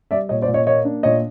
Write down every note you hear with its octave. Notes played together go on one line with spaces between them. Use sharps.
G3 D5 E5
A#2 C#5 D#5
C5 D5
A#2
C#5 D#5
A#3 C#5 D#5
D4
A#2 C#5 D#5